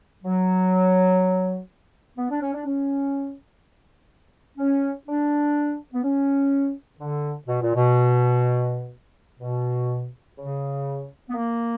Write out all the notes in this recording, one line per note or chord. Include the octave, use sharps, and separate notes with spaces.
F#3
B3
D4
C#4
D4
C#4
C#4
D4
B3
C#4
D3
B2
A#2
B2
B2
C#3
B3
A#3